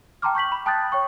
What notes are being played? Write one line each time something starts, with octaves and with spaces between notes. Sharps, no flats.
G5 A5 A#5 C6 D6 F6
C#6 G6 B6 F#7
B5
G5 A5 D#6 F#6 G6 A6
C#5 G5 C#6